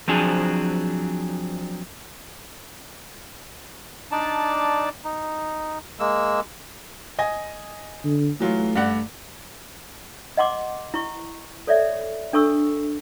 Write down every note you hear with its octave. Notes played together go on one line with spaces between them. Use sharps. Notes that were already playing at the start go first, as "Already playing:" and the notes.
F3 F#3 C4 D4 G#4
D4 D#4 D5 A5
D#4
G#3 A#3 E6
D#5 G#5 A#6
D3
E3 F#3 A3 F4
G2 D5 F#5
D#5 F#5 C6 D6
E4 C#6
A4 C#5 D5 E5
D4 A4 C#6 E6